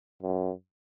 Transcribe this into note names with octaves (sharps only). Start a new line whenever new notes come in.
F#2